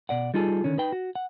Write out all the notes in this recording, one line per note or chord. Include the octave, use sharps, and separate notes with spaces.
B2 D5 F#5
G3 D#4 F4 G#4 A4
D3 D#3 C#4
D#4 B4 G5
F#4
F#5